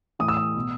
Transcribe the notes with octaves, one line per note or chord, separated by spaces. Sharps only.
A2 E3 D#6
E6
D#6
B2